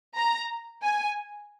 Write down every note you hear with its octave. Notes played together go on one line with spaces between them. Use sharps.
A#5
G#5